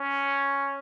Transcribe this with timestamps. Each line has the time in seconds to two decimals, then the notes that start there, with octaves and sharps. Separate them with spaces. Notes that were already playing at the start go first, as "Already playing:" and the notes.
Already playing: C#4